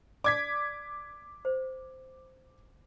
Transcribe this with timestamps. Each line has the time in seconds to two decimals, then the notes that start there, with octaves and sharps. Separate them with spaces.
0.24 D5 D6 G#6 B6
1.45 C5